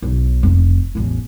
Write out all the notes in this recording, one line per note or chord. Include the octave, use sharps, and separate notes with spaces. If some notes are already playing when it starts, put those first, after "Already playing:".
B1
F1
A1 E2